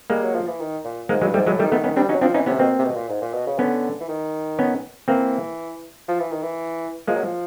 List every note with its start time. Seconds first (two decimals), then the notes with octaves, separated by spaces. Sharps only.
0.10 G3 G#3 A#3
0.23 F#3
0.35 F3
0.47 E3
0.60 D#3
0.84 A#2
1.09 G#2 G#3 A#3
1.22 G2 F#3 G#3
1.34 G#2 G3 A3
1.46 A2 F#3 G#3
1.59 D#3 G3 A3
1.72 D#3 A3 B3
1.84 D#3 B3 C#4
1.96 G3 C4 D4
2.09 F#3 C#4 D#4
2.21 F3 C4 D4
2.34 E3 C#4 D#4
2.46 C3 B3 C#4
2.59 B2 A#3 C4
2.79 C3
2.84 B2
2.96 A#2
3.09 G#2
3.22 A#2
3.34 B2
3.47 C#3
3.58 D3 B3 C#4
4.00 E3
4.08 D#3
4.59 B3 C#4
5.08 E3 A#3 C4
6.08 F3
6.19 E3
6.31 D#3
6.43 E3
7.07 F3 G#3 A#3
7.16 F#3
7.24 F3